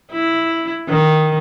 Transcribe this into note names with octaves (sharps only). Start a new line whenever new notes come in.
E4
D#3